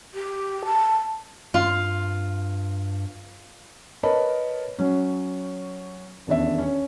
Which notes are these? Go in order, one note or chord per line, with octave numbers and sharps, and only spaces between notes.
G4
A5
G2 F4
A#4 B4 C#5 D#5 A5 B5
F#3 C#4
D#1 E2 D4 E5
C#4 C#5